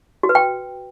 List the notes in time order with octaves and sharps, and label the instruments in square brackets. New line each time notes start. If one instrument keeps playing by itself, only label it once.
[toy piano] F#4
B4
G5